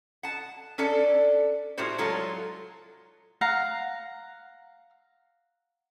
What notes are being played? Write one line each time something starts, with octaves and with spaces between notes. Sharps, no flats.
F#5 A5
C#4 D4 A4 D5 A5
A2 G3 F4 F#4 C5
F#3 G#3 F4 A4 C#5
F5 F#5 A#5